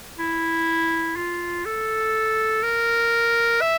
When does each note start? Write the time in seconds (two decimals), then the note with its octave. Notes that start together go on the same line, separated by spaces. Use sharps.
0.19 E4
1.17 F4
1.66 A4
2.63 A#4
3.61 E5